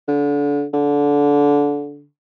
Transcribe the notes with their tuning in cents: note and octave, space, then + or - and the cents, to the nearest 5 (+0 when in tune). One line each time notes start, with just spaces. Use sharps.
D3 -30
D3 -20